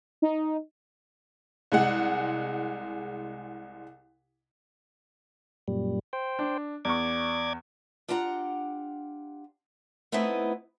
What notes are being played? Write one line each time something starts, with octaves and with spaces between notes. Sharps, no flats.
D#4
C2 G#3 F#5
F#2 A#2 G3
C5 G5
D4
E2 D5 C#6 D6 G#6
D4 F4 G4 F#5 A5 A#5
A3 B3 C4 D#4 E4 D#5